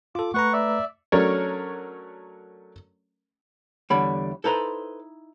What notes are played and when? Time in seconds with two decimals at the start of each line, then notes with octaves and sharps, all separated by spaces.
0.15 F4 A4 D6
0.34 A3 B4 F#5 A#5 C#6
0.53 D5 E5
1.12 F#3 A3 C#4 D4 A#4 C#5
3.90 E2 D3 G3 E4 C#5 B5
4.44 D#4 E4 A4 B4 C5 A#5